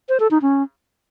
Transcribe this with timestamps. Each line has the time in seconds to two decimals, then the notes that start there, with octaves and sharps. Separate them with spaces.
0.09 C5
0.20 A4
0.31 D#4
0.42 C#4